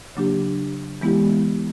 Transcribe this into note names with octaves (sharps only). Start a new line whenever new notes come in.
C#3 F#3 A#3 D4 G4
E3 G#3 B3 E4 G4